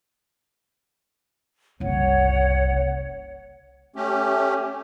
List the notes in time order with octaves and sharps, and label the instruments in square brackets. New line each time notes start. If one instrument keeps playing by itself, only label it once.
[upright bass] F#1 C2 [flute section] C#5 F#5
[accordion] A3 C#4 G4